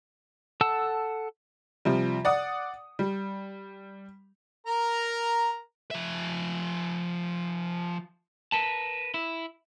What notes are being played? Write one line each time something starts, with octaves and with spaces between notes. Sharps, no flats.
A4 F#5 A5 E6
C3 F3 G3
D5 F#5 D#6
G3
A#4 A#5
F3 E5
A#4 B4 A5
E4